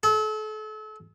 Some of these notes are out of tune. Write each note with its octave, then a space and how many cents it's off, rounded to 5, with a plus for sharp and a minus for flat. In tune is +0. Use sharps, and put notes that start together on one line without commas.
A4 -35